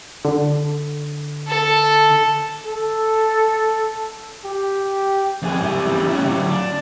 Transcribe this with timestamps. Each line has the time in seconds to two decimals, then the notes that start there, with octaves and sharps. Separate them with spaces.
0.25 D3
1.48 A4
2.67 A4
4.45 G4
5.42 F2 G#4
5.61 G3 E4
5.89 E2 G3
6.09 C#4 E4
6.25 D3 F#3
6.49 D4